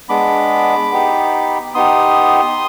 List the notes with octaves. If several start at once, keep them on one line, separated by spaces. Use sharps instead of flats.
G#3 B3 D4 B5 D6
B3 D#4 G4
B3 D#4 G4 C6 D#6